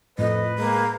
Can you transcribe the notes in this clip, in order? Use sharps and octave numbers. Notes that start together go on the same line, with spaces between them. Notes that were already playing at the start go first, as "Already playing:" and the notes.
F2 A2 B4 D#5
G#3 A#3